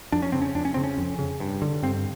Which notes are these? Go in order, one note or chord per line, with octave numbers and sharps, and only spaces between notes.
F2 D4
C#4
C#3 C4
C#4
F2 D4
C#4
C#3 C4
C#4
F2
C#3
G2
D3
G2 C4